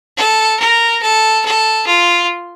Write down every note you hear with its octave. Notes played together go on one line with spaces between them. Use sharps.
A4
A#4
A4
A4
F4